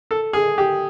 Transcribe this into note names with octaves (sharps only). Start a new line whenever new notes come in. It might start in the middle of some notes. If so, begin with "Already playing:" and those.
A4
G#4
G4